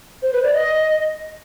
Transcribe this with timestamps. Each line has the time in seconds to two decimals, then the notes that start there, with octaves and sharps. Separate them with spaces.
0.22 C5
0.33 B4
0.43 D5
0.53 D#5